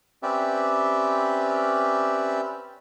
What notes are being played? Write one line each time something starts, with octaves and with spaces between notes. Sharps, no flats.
C4 C#4 G4 B4 D5 E5